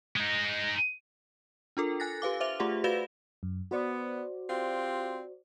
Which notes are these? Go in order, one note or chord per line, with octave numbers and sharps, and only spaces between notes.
G#3 D#4
D4 F4 A4 A#4
G#5 F#6 A6 A#6
G4 B4 F5 D6
C5 E5 D6 F7
A3 F4 G4 G#4 F#5
F#4 B4 D5 F5 E7 G7
F#2
B3 F#4 C5 D5
C4 F4 G4